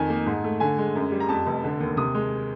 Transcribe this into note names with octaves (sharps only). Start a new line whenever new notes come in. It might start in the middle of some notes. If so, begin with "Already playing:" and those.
Already playing: F2 D#3 G#5
A#3
G#2
A3
D3 G#5
G#3
F#2
G3
A#5
F2 A5
F1
D3
D#2
C3 D#6
G#3